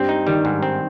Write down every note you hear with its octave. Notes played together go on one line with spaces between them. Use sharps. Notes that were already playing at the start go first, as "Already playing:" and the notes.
Already playing: G2 G3 C4
D#4
D#3 G3
G#2
C4